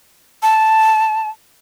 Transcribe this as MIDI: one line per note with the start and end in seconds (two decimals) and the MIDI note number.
0.42 1.29 81